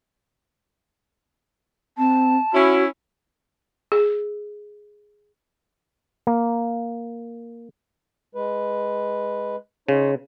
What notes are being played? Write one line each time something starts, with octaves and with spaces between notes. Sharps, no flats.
C4 A5
C#4 E4 F#4
G#4
A#3
G#3 B4
C#3 D#4 C5 C#5